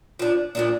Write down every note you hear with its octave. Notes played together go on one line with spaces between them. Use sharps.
F3 D4
A#2 F3 A#3 D4